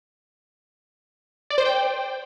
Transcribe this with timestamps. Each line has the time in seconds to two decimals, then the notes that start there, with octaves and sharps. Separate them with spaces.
1.50 D5
1.58 C5
1.65 G5